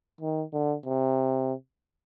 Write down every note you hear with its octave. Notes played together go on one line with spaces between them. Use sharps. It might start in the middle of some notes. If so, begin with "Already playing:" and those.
D#3
D3
C3